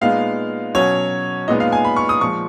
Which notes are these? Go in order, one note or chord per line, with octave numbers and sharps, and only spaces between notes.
A#2 G#3 B3 D#4 F5
B2 F#3 C#4 C#5
A#2 G#3 B3 D#4 D#5
F5
G#5
B5
C#6
D#6
A#2 F3 G#3 C#6